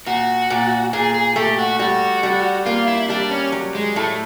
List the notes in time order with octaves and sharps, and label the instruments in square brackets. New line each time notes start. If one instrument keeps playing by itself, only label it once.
[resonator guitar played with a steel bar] A#2 [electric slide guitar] F#4
[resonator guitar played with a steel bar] A#2
[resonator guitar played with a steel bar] A#2 [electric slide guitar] G#4
[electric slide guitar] G#4
[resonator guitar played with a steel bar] A3 [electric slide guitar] G4
[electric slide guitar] F#4
[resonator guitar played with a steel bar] G3 [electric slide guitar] F#4
[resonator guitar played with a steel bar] G3
[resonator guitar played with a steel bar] A#3 [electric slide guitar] F4
[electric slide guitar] E4
[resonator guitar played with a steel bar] G3 [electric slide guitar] D4
[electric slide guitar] C#4
[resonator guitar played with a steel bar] F#3
[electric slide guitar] G#3
[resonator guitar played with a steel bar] A2 [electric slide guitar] A3